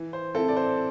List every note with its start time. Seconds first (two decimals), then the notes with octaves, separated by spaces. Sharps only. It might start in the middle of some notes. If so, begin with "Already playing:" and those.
Already playing: E3
0.13 C5
0.35 C4 E4 A4
0.48 D5
0.56 C5